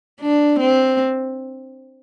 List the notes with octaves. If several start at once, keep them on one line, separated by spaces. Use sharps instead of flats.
D4
C4